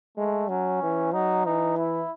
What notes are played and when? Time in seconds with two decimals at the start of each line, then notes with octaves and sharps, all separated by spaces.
0.17 G#3 A3
0.49 F#3 C#4
0.82 E3
1.13 F#3 D#4
1.46 E3 D#4
1.78 E4